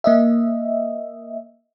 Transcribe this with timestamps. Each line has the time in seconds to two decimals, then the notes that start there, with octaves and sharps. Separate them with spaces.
0.04 A#3 D#5 E5